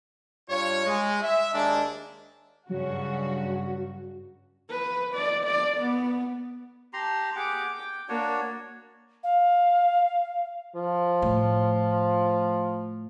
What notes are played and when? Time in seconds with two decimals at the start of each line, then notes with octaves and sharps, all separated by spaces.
0.49 G2 F4 C#5
0.86 G#3
1.23 E5
1.54 D#2 G#3 A#3 D4
2.70 G2 C#3 F#3 F#4
4.70 B4
5.14 D5
5.44 D5
5.77 B3
6.93 G4 A5 A#5 C6
7.36 G4 G#4 F#5 D6
7.76 G5
8.09 A#3 D4 F#4 C#5
9.24 F5
10.76 F3
11.22 A2